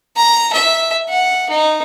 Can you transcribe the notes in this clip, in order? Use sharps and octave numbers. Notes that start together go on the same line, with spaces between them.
A#5
E5
F#5
D#4